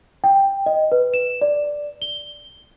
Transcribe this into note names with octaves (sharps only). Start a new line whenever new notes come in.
G5
D#5
B4
E7
D5
G7